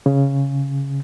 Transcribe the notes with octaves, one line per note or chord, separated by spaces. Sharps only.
C#3